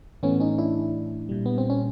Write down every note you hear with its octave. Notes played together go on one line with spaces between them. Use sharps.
A2 E3 A3 B3 C#4
C#4 D#4
D4 E4
A#2 G3
B3
C4
C#4